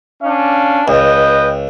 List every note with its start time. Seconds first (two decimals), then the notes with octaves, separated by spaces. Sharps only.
0.23 C#4 D4 F5
0.88 C#2 B4 D#5 G5